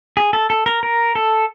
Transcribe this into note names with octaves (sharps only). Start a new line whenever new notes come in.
G#4
A4
A4
A#4
A#4
A4